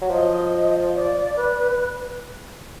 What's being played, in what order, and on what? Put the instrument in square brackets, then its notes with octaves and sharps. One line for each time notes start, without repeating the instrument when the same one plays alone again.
[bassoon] F#3
[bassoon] F3 [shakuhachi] D#5
[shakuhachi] D5
B4